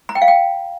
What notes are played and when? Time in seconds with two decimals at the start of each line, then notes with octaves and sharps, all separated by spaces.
0.09 A#5
0.15 G5
0.22 F5
0.28 G5